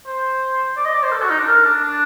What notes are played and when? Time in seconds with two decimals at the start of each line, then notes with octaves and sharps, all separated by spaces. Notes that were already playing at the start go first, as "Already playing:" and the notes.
0.06 C5
0.77 D5
0.85 D#5
0.94 D5
1.03 C5
1.12 A4
1.22 F#4
1.30 D#4
1.39 D4
1.47 A#4
1.65 D4
1.84 D4